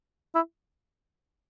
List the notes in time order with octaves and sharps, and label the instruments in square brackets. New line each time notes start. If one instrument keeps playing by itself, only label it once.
[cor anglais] E4